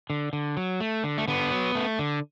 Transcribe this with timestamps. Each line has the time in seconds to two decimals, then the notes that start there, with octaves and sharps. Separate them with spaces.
0.10 D3
0.33 D3
0.57 F#3
0.80 A3
1.04 D3
1.18 A3
1.28 D3 B3
1.51 F#3
1.75 A3
1.99 D3